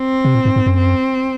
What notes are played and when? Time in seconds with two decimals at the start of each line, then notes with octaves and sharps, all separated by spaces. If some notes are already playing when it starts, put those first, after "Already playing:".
Already playing: C4
0.25 C3
0.35 A#2
0.45 G#2
0.56 G#2
0.66 F#2
0.78 C4